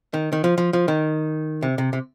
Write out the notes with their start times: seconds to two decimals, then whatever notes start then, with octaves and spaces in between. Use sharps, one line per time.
0.14 D#3
0.33 D#3
0.44 F3
0.58 F3
0.73 F3
0.88 D#3
1.63 C3
1.78 C3
1.93 C3